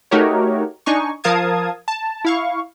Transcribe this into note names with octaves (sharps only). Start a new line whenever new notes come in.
A3 D#4 F#4 G4 A#4 C#5
D4 D#4 G#5 C#6
F3 A#4 F5 A5 D#6 G#6
A5
E4 F5 C#6